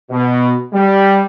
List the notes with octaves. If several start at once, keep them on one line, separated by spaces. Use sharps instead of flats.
B2
G3